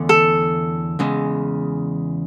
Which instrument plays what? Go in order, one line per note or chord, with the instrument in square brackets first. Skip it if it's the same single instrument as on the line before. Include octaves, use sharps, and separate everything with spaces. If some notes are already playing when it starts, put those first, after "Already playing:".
Already playing: [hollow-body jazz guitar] E2 D3 A3 C#4
[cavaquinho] A4
[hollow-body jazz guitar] E2 C#3 G#3